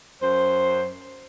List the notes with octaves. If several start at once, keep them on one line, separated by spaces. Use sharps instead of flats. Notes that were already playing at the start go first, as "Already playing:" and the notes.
F#2 C5